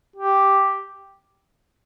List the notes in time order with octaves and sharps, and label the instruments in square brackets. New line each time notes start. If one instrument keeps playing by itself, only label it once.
[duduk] G4